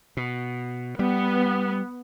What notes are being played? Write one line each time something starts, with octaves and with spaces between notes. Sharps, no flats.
B2
G3 B3